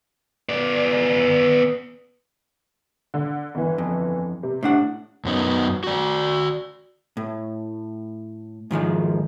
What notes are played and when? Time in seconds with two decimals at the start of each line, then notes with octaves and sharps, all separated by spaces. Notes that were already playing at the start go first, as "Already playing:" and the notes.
0.49 B3 D5
3.14 D3
3.55 G1 E3
3.78 F2
4.43 C3
4.63 A2 D4 F#5
5.25 F#2 F#3 B3 D#4
5.84 F#4 D5
7.17 A2
8.71 G#2 D#3 F3 G#3